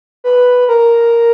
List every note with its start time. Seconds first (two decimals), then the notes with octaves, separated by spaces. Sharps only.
0.24 B4
0.69 A#4